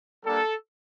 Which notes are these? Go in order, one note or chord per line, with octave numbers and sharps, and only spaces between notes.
G3 A#3 D4 A4